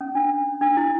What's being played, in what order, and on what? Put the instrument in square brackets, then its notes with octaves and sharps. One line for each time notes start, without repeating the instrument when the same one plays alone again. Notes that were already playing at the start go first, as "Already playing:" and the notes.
[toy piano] C#4
D4
D4
E4